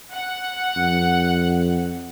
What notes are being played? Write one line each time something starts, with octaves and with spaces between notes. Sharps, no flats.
F#5
F2